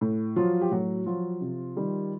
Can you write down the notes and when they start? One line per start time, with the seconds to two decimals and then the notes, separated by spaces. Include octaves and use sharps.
0.01 A2
0.36 F3 F#3 F4
0.61 G4
0.71 A2 F#3 F#4
1.06 F3 F#3 F4
1.41 C3
1.76 D#3 G3